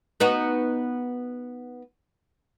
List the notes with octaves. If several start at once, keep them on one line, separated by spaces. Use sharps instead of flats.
B3 D#4 F#4